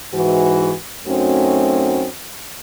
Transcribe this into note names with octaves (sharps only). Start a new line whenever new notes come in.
G#2 E3 F#4
F#2 A3 C4 C#4 D#4 F#4